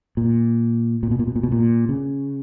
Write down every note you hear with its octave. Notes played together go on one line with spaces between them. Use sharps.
A#2
A#2
B2
A#2
B2
A#2
B2
A#2
C#3